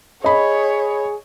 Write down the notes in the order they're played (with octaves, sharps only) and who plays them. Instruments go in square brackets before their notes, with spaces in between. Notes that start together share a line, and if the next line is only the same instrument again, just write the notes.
[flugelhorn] G#4 [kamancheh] C#5 [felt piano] D#5 B5